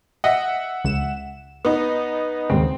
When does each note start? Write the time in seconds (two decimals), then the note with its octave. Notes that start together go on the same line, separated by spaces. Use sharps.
0.24 D#5 E5 F#5
0.84 C#2 E7
1.65 B3 D#4
2.50 D#2 G#2 C#3 C4